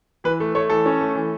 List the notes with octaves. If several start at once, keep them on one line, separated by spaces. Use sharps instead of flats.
E3 B4
A3
A3 C#5
E3 A4
C#4
A3
E3